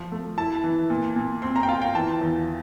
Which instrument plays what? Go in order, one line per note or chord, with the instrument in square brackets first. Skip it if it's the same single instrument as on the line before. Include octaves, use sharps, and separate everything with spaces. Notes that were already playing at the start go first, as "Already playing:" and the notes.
Already playing: [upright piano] F3
A3
E4 A5
E3
A#2
A#2
C4 C6
A#5
G5
F4 F5
G5
E3 A5
E2